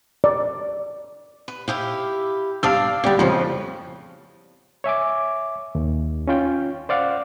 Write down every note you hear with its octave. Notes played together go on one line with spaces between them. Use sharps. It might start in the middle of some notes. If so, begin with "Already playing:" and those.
D5
B4
E4 G4 F5
G2 D4 D5 F5 A5 E6
D3 G3 B3 G4 D5
F2 A2 C#3 F3
C#5 E5 G#5 D6
D#2
C#4 F4 G5
C5 D5 F5 F#5